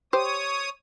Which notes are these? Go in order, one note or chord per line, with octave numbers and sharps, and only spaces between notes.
G4 C5 C#5 D#6